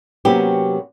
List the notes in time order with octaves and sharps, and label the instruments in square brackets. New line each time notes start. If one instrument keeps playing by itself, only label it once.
[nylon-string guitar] C3 F#3 A#3 B3 C#4 G4